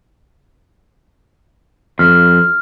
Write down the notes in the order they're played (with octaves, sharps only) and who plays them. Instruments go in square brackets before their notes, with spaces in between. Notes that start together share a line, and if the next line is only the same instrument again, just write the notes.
[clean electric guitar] F2 [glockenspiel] F6